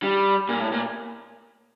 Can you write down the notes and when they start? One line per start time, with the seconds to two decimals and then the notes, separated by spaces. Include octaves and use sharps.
0.03 G3
0.49 A#2
0.60 A2
0.72 A#2